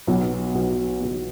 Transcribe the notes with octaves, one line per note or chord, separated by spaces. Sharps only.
B1 B2 F#3 B3
B1 B2 F#3 B3
B1 B2 F#3 B3